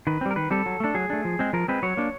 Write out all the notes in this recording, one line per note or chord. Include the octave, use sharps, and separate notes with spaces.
D#3 B4
G3 C4
A#4
D#3 B4
G3 C4 A4
F#3
A3 D4 A4
F#3 G#4
A3 D4
F3
G#3 C4
F3 A#4
G#3 C4 B4
F#3 C#5
A#3 D4